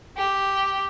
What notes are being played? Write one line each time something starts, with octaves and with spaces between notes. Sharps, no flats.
G4